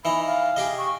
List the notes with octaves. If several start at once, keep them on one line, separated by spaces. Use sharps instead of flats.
E3 D#4 A#5 B5
F5
G4 G#4 D#5
C#6